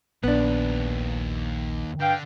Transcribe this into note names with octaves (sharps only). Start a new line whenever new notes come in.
A#1 D#2 B3 D4 B4
G2 D3 F5 G5